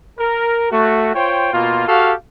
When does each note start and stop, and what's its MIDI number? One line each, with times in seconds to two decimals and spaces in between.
0.19 0.67 70
0.71 1.13 57
0.71 1.13 66
1.15 1.51 65
1.15 1.51 72
1.15 1.51 73
1.15 1.51 79
1.54 1.83 47
1.54 1.83 58
1.54 1.83 65
1.88 2.13 66
1.88 2.13 67
1.88 2.13 69
1.88 2.13 77